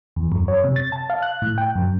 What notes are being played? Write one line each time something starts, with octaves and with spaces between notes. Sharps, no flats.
E2
F#2
C#5
C3
A6
A5
F5
F#6
A2
G5
F#2